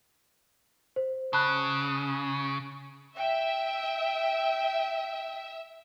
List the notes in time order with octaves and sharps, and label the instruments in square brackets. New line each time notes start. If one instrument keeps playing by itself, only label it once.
[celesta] C5
[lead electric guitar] C#3 [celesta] A5 B5 F#6
[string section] E5 [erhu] G5